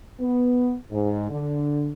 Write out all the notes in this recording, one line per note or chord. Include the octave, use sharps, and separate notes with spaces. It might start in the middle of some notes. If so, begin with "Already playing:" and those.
B3
G#2
D3